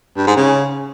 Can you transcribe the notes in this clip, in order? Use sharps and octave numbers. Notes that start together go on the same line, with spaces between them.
G2
G#2
C#3